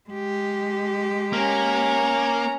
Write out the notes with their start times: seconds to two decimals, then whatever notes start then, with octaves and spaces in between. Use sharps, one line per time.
0.10 G#3 G4
1.33 A#3 C#4 A#5